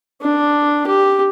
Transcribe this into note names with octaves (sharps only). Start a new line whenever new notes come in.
D4
G4